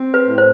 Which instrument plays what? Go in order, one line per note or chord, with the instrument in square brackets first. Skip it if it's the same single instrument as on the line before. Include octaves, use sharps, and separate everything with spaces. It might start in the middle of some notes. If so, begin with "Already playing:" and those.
Already playing: [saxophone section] C4
[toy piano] B4
[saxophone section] A2
[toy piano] C5